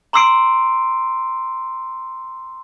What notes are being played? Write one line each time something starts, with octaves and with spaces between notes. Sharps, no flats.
A#5 C6 D6 E6 C7 D7